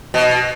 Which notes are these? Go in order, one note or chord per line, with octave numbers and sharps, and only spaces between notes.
B2